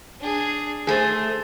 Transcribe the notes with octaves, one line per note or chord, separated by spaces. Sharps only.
D4 G#4
A3 G#4 C5